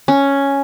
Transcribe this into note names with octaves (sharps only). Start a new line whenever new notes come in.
C#4